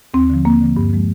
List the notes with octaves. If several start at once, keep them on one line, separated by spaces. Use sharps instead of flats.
D#2 C4
D3 F3
D#2 A#3
D3 F3
G2
F3 G#3